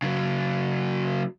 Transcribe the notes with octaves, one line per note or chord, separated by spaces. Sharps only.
C#3 F#3